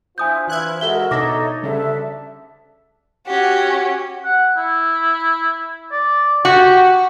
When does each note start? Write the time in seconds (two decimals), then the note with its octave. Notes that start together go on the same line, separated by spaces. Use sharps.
0.18 D4 E4 F4 C5 G#5 D#6 G6
0.47 E3 E4 B4 F#6 G#6
0.81 G#3 F#4 A4 A#4 E5 G7
1.11 B2 D4 D#4 A4 C#5 E5 D6 A#6
1.63 D2 C#3 G3 D4 A4 E5
3.26 C#4 F#4 G4
4.24 F#5
4.57 E4
5.91 D5
6.45 F#4 G4